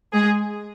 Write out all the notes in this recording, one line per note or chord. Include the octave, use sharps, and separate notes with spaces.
G#3 G#4